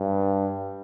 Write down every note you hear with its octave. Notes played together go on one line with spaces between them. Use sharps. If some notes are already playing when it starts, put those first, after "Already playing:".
Already playing: G2